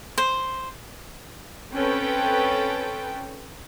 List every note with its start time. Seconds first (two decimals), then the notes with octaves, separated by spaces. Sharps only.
0.18 C5
1.74 C4 C#4 A4 B4 G5